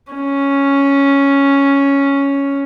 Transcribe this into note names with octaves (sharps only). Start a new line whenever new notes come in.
C#4